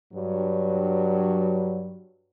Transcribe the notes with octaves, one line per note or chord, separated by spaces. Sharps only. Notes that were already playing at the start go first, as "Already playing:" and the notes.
G2 F#3